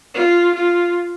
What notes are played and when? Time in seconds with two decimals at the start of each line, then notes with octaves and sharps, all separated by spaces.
0.14 F4
0.55 F4